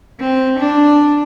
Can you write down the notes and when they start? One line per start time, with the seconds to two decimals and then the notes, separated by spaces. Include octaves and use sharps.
0.20 C4
0.59 D4